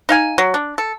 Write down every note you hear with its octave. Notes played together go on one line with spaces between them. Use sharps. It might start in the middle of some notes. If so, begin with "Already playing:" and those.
D#4 F5 G#5
F#3
D4
A4